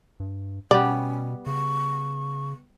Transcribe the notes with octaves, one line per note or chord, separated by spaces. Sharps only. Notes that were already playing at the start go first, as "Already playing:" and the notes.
G2
B2 G3 B3 C#4 G4 D5
C#3 C#6